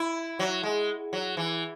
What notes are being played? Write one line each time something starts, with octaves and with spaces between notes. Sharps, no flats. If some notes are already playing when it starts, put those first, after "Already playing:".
Already playing: E4
F#3
G#3
F#3
E3